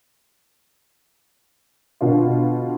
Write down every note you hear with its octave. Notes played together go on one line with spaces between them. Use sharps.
B2 D3 F4